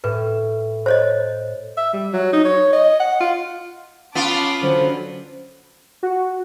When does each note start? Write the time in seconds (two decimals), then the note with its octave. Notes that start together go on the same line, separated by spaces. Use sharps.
0.04 A2 B4
0.86 C5 C#5 D#5
1.77 E5
1.93 G3
2.13 F#3
2.33 D#4
2.45 C#5
2.73 D#5
3.00 F#5
3.21 F4
4.15 B3 C#4 F4 A5 D6
4.62 D3 F#3 C5
6.03 F#4